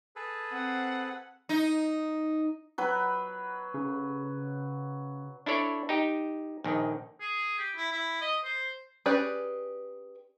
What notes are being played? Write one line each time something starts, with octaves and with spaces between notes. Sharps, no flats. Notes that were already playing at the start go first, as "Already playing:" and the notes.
G#4 A4 B4
C4 F#5
D#4
F#3 B4 B5
C#3
D4 E4 A4 C#5 D5
D#4 G4
A#1 D#3
G#4
G4
E4
E4
D#5
C5
C#4 G4 G#4 B4 D5